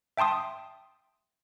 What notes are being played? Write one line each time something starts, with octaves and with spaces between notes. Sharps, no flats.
E5 G5 A5 C6 D#6